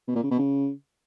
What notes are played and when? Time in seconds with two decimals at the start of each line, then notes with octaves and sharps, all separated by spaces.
0.08 B2
0.15 A#2
0.23 C#3
0.31 B2
0.39 C#3